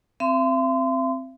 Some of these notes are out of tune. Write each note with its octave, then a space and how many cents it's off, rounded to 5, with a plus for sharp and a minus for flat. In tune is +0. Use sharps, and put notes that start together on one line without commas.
C4 +0 E5 +45 C6 -30